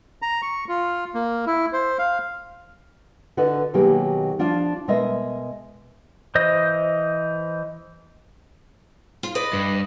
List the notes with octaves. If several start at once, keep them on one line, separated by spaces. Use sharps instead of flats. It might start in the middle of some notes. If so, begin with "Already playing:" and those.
A#5
C#6
F4
A#3
E4
C5
F5
D3 F#4 B4 D#5
B2 D#3 F#3 A#3 G4 G#4
F3 D4 F4
B2 G#3 A#4 D#5 E5
E3 C5 D#5
F4
B4 D5 D#5
G2